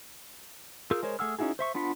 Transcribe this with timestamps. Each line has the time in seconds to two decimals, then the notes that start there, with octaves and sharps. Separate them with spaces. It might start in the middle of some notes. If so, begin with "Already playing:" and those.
0.91 F4 G#4 A#4 E6 G6
1.03 G#3 A#4 C5 C#5
1.19 A3 G#4 F#5 E6 F6
1.39 C#4 D#4 E4 F#4 G#4
1.59 C5 E5 C#6
1.75 B3 D4 F4 F#5 B5